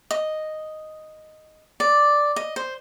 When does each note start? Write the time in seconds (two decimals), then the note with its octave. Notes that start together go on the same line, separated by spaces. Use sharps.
0.11 D#5
1.80 D5
2.36 D#5
2.56 C5